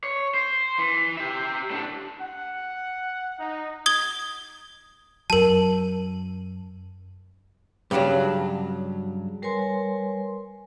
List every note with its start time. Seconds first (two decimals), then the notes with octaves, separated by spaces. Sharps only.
0.03 C#5
0.34 C5
0.79 E3
1.17 G4 E5
1.70 A2 D4
2.19 F#5
3.38 D#4
3.86 D#6 G#6 G7
5.30 F#2 F#3 A#4 A5
7.91 G2 C#3 F3 F#3 D4
9.42 G3 A#4 B4 C#5 G#5 C6